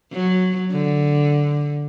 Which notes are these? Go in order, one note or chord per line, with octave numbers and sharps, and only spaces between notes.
F#3
D3